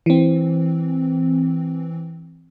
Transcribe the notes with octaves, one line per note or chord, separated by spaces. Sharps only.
E3 C4